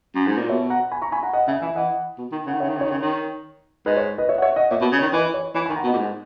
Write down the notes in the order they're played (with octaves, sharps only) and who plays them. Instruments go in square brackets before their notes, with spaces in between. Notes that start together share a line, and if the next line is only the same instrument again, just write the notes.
[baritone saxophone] F#2
G#2
A#2
[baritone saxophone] B2 [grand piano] C#5 E5
[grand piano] F#5 A#5
G#5 B5
A#5 C#6
G#5 B5
F#5 A#5
D#5 F#5
[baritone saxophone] C#3 [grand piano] E5 G#5
[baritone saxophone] E3 [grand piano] E5 G#5
[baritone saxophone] E3 [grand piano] D#5 F#5
[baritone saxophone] B2
D#3
[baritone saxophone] C#3 [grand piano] F#5
[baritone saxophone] D#3
[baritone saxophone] C#3 [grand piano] C#5 E5
[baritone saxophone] D#3
C#3
[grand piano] C#5
[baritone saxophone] D#3
C#3
[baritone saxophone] D#3 [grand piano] C#5
[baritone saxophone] G#2 [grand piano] B4 D#5
[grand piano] C#5
B4 D#5
C#5 E5
F#5
C#5 E5
D#5 F#5
[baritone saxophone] A#2 [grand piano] C#5 E5
[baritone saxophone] B2
C#3
[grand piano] C#5
[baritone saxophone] D#3
[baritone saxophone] E3 [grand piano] B4 D#5
[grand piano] C#5
[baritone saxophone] E3 [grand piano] C#5
[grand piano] G#5 B5
[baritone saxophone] D#3
[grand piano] F#5 A#5
[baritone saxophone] B2
[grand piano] D#5 F#5
[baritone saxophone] A#2
G#2